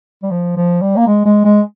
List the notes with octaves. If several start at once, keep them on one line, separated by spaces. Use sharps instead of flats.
G3
F3
F3
G3
A#3
G#3
G#3
G#3